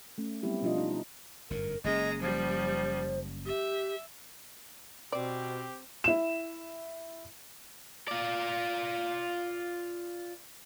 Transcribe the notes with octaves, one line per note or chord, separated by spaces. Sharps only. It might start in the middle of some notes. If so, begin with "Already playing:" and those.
A3 C#4
F#3 G3 B3 C4 E4 G4
B2 F3 D4 F4 D#5
D#4
G1 F#2 A2 A#4
F#1 G#3 A#3 C#4 D#5 A#5
F3 G3 C5
G4 E5
B2 C4 G4 D5
E4 E7
F4 D5